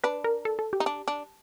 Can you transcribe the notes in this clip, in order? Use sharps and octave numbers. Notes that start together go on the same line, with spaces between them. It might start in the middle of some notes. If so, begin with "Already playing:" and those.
D4 B4
A#4
A4
A4
G4
D#4
D4
D4